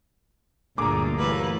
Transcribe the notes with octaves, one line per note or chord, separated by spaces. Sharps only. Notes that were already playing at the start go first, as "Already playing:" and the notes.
G1 D2 A#2 A3 D4 G#4 A#5 D6
E3 F#3 G3 A3 A#3 B4